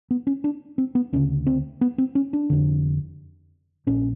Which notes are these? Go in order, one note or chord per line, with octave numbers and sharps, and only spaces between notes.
B3
C#4
D4
C4
B3
D2 C#3 C#4
C4
B3
C4
C#4
D4
F1 F2 D3
A#1 A#2 C#4